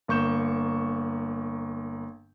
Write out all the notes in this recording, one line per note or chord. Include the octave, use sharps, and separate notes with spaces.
G1 A#3 C#6 G6 E7